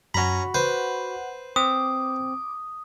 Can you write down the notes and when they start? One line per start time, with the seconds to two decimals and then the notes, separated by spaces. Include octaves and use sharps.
0.14 F#2 C#4 F#4 A#5 B5
0.54 B4 C5 F#5
1.56 C4 D6 D#6